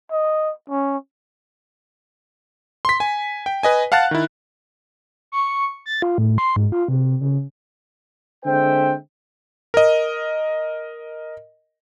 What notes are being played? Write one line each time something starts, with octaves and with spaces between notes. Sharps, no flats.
D#5
C#4
C6 B6
G#5
G5
B4 D#5 G#5
F5 F#5 A5 F#6 A6
D#3 E4
C#6
A6
F4
A2
C6
G#2
F4
C3
C#3
D3 G#3 C4 C5 E5 G5
A#4 D#5